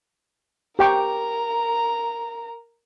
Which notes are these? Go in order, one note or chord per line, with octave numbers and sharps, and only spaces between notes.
G4 A#4 G5 A#5 C#6